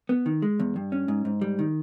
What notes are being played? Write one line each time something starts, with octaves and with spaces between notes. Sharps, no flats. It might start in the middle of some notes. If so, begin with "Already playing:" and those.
B3
D#3
G#3
E2
G2
C#4
G#2
G#2
G3
D#3